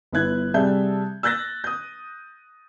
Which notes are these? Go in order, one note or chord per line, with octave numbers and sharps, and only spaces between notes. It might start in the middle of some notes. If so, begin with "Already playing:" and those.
G1 B3 E4 F#6 G#6
C3 G3 G#4 E5 A5 G6
E6 F#6 G6 A6 A#6
D#6 G6